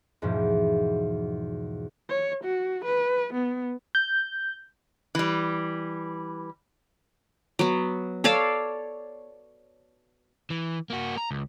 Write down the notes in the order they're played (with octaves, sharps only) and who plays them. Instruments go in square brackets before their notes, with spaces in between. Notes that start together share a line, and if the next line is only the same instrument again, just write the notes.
[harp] E2 G#2 B2 F3
[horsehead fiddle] C#5
F#4
B4
B3
[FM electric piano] G6
[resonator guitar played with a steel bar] E3 G3
[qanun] F#3 B3
A4 C#5 D5 F5
[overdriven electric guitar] E3
A#3 F#4
A#5
C#2